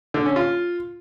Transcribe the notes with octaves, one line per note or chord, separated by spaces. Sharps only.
D3
C#4
F4